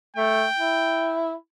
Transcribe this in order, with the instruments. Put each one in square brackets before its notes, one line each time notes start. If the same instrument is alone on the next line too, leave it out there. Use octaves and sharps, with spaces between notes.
[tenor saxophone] A3 [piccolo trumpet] G5
[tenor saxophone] E4